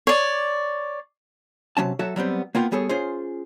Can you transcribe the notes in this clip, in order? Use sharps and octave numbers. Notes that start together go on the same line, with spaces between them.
C#5 D5
C3 F#3 C#4 A5
F#3 F#4 A4 E5
F#3 G3 B3 C4
A#3 B3 F4 G5
G3 B3 G#4 A4 C#5
C#4 F4 G#4 C5